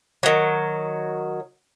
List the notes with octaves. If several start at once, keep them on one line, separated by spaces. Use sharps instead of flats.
D#3 F#3